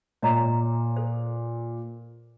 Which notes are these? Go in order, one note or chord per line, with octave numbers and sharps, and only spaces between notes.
A#2 C#5 D#5 A#5
A4 C5